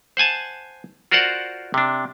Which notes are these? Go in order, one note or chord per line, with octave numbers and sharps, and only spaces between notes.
C5 F#5 G#5 A5
F4 F#4 A#4 C5 D5 F#5
C3 D4